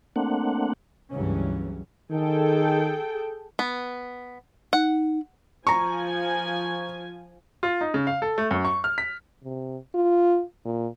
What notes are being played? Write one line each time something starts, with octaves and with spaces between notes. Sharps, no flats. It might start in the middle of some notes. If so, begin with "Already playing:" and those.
A3 A#3 C4 D4 F#5
C#2 G2 C#3 E3 F#3 C#4
D#3 G#4 A4 G5
B3
D#4 F#5
F3 G#5 A#5 C#6
F4
D#4
C#3
F5
A4
A3
F#2
C#6
F6
B6
C3
F4
A#2